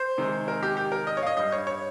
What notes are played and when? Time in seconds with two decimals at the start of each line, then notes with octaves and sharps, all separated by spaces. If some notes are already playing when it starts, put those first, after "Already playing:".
Already playing: C5
0.18 C3 D#3 G#3
0.48 A#4
0.63 G4
0.77 G4
0.92 A#4
1.07 D#5
1.17 C#5
1.23 F5
1.27 D#5
1.37 G2 G3 D#5
1.52 C#5
1.67 C#5